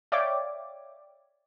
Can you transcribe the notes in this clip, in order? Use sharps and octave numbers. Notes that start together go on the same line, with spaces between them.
C#5 D5 E5 F5 G5 D6